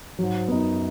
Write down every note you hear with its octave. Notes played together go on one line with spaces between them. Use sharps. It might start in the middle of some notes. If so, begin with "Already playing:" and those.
G#2 F#3
F#2 B3 D#4